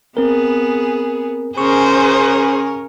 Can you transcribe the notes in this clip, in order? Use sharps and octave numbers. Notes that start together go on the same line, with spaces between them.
B3 C4 G#4 A#4
C#3 C#4 G#4 A#4 C5 C#6